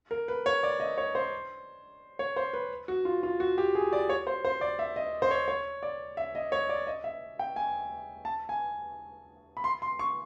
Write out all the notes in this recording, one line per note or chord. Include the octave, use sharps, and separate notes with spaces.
A#4
B4
C#5
D5
D#5
C#5
C5
C#5
C5
B4
F#4
F4
F4
F#4
G4
G#4
D5
C#5
C5
C5
D5
E5
D#5
C5
C#5
C#5
D5
E5
D#5
C#5
D5
D#5
E5
G5
G#5
A5
G#5
B5
C6
C6
C#6